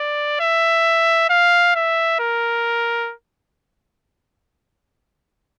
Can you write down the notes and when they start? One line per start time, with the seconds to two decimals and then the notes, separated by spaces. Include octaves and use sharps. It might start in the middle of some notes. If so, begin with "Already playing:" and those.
Already playing: D5
0.40 E5
1.30 F5
1.75 E5
2.20 A#4